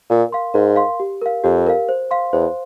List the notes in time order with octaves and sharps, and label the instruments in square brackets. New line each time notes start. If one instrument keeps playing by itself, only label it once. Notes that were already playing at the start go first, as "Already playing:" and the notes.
[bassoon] A#2 [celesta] A#4
[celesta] F5 C6
[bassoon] G#2 [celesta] A#4
[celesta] F5 C6
G4
A#4 F5
[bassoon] F2 [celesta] G4
[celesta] A#4 F5
C5
F5 C6
[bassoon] E2 [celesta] C5